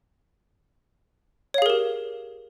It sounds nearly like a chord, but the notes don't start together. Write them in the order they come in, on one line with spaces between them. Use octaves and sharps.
C#5 F5 G#4 A#4 G4